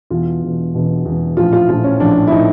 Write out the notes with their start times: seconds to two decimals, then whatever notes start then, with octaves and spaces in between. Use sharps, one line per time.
0.10 E1 E2 B2 F4
0.43 E1 E2 B2
0.74 E1 E2 B2
1.05 E1 E2 B2
1.37 A#1 A2 F3 F4
1.53 F4
1.69 A#1 A2 F3 F4
1.84 C#4
2.00 A#1 A2 F3 D4
2.27 E4
2.32 A2 F3 D#4